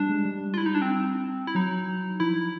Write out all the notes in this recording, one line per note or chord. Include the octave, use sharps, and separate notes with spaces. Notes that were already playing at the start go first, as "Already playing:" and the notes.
Already playing: G3 D4
G#3
G3
F4
E4
D#4
D4
C4
E4
F#3 D#4
F3 E4